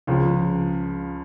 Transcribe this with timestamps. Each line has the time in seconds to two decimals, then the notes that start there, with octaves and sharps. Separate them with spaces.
0.07 C#2 C#3 F3